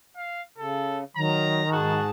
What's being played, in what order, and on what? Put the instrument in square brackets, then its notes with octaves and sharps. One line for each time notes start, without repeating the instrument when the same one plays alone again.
[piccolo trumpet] F5
[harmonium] C#3 [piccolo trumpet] A4
[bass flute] D#3 [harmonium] F#3 [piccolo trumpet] A#5
[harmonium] G#2 G#4 A5 [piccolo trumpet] F#4